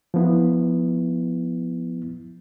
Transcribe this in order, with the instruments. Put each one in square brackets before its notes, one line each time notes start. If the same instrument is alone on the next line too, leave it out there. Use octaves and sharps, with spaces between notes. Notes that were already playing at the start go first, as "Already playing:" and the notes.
[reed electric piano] F3 B3 E4